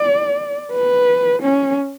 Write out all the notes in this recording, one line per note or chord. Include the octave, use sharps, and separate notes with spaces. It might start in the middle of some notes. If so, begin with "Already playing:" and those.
Already playing: D5
B4
C#4